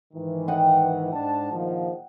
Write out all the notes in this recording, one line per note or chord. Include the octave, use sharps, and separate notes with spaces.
G#2 D#3 E3
D#5 F#5 G5
G#2 D4 A5
A#1 D#3 F3